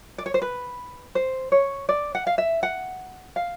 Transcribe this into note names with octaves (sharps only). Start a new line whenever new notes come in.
D5
C#5
C5
B4
C5
C#5
D5
F#5
F5
E5
F#5
F5